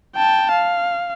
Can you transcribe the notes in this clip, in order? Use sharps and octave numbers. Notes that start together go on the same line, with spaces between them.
G5 A5
F5